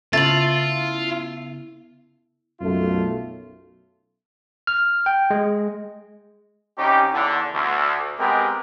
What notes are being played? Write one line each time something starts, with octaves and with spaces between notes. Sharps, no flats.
C#3 A3 B3 E4 F4 C5 A6 F#7
B1 F#2 A3 F4
F6
G5
G#3
C2 C#4 D#4 G4
E2 D3
D2
G#3 B3 C4 G4 G#4 A#4